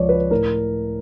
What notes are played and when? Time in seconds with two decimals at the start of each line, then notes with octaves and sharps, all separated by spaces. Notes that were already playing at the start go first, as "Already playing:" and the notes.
Already playing: C#2 F3 C#5 D5
0.09 B4
0.31 A2 A#4